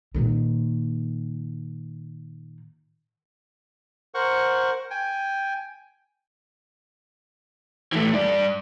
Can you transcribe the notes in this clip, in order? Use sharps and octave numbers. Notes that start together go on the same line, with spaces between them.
A#2 D#3
A#4 C5 F#5 C#6
G5 G#5
E3 A3
G2 D5